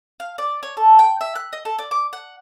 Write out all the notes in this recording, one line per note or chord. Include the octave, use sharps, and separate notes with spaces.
F5
D5
C#5
A4
G5
E5
F#6
D#5
A4
D5
D6
F#5